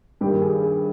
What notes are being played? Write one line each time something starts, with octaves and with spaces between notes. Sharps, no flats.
G2 D#3 G4
G#4
G#4